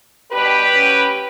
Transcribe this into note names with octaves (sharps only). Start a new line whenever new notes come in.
B2 G3 D4 G4 B4
A2 F#3 C#4